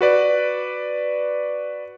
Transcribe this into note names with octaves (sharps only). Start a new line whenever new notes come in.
F#4 B4 D5